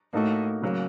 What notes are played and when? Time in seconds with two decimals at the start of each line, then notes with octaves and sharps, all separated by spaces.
0.13 A2 A#3 D#4 F#4 A4
0.62 C#3 F#3 A#3